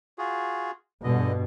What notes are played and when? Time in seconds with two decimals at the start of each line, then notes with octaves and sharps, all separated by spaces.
0.18 F4 F#4 G#4
1.04 E2 G2 B2 D3 D#5